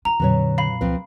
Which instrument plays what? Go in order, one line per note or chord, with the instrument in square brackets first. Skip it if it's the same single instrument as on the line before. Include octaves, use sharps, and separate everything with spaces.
[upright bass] F4 [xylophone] A#5
[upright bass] F2 A#2 [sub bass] D3 [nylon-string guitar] F#3 B4 C#5
[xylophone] F5 B5
[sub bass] C#2 [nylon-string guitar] F3 C4 B4